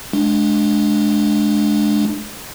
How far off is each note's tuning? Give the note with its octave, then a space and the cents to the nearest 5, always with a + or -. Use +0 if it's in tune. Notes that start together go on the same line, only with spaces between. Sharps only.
G#3 +30 D4 +0